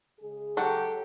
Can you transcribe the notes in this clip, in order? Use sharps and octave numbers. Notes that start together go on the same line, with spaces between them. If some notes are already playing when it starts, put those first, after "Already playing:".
C#3 G#3 G#4
F#3 G4 A4 F#5 G5